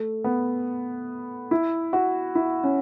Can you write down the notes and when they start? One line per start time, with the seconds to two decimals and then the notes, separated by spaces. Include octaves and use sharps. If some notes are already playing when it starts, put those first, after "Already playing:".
Already playing: A3
0.24 B3
1.51 E4
1.93 F#4
2.35 E4
2.64 C#4